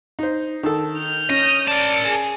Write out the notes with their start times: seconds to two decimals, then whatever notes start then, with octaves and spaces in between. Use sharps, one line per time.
0.19 D#4 C5
0.63 D#3 A4
0.97 F6 G6
1.30 C#4 D#5
1.68 A#4 D5 A5
2.05 G#4